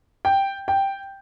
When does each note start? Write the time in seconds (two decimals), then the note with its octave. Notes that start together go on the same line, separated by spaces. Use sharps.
0.25 G5
0.68 G5